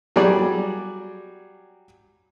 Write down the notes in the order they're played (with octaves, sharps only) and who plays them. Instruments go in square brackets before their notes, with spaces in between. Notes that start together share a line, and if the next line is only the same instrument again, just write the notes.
[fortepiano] F#3 G3 G#4 D5